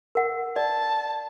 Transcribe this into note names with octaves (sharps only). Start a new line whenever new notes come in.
A#4 F#5
D5 A5